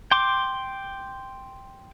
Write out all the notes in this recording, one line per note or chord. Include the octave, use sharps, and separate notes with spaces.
G5 C6 D6